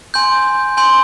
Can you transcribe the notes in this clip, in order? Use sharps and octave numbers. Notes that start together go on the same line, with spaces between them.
G#5 C6 G6
G#5 C6 G6